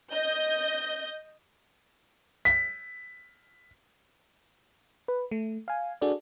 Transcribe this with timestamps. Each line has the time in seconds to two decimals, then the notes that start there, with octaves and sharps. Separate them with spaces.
0.14 D#5 G6
2.45 B6
5.08 B4
5.31 A3
5.68 F5 G#5
6.01 D4 F#4 G#4 A4 D5